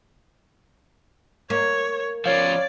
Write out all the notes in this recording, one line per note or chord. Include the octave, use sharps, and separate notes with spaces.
A#3 C#5
F3 C#4 C#5 D5 F5